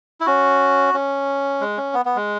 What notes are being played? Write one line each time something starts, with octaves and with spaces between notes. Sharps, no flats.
E4
C#4 F#4
C#4
G#3
C#4
B3
B3
G#3